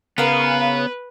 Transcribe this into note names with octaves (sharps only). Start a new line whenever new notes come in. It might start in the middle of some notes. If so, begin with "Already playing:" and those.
C#3 B3 A#4 B4 F5